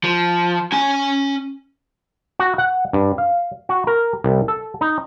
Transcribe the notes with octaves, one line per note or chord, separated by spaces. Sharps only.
F3
C#4 G#5
F#4
F#5
G2
F5
F#4
A#4
C2
A4
D#4